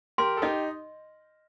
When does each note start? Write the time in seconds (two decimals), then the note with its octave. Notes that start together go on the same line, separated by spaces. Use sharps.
0.18 G4 A#4 C6
0.37 A4
0.42 D#4 G4 D#5